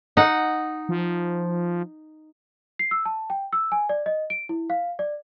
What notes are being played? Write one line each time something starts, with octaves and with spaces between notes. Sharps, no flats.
D#4 F#5
F3
C7
E6
A5
G5
E6
G#5
D5
D#5
D7
E4
F5
D5